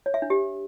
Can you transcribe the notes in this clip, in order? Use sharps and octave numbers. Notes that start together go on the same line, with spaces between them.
C#5
E5
D4
G4